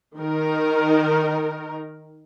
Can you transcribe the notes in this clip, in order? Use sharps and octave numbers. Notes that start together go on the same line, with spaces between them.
D#3 A#4